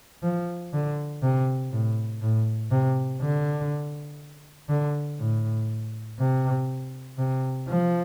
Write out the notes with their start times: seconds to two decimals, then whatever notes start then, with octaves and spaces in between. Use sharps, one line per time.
0.23 F3
0.73 D3
1.22 C3
1.72 A2
2.21 A2
2.71 C3
3.21 D3
4.69 D3
5.19 A2
6.19 C3
7.18 C3
7.68 F3